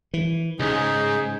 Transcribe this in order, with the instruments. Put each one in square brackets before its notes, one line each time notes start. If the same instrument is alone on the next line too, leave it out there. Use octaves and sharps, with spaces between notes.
[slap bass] E3
[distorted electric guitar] C2 G#2 [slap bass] C#3 [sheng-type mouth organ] D#4 G#4